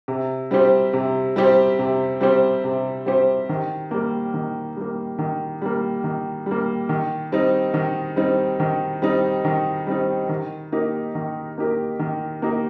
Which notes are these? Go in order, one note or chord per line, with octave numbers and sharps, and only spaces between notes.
C3
G3 C4 G4 C5
C3
G3 C4 G4 C5
C3
G3 C4 G4 C5
C3
G3 C4 G4 C5
D#3
G3 A#3
D#3
G3 A#3
D#3
G3 A#3
D#3
G3 A#3
D#3
G3 C4 D#4
D#3
G3 C4 D#4
D#3
G3 C4 D#4
D#3
G3 C4 D#4
D#3
A#3 D#4 G4 A#4
D#3
A#3 D#4 G4 A#4
D#3
A#3 D#4 G4 A#4